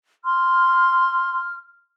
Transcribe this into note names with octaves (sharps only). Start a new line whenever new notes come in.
C6 F6